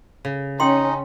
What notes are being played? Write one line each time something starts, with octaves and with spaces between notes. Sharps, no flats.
C#3
C#4 D#4 G5 C6